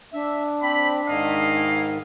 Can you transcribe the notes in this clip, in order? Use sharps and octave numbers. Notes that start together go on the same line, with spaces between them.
D4 E5
C4 B5
G#2 D#3 E4 D#5 F5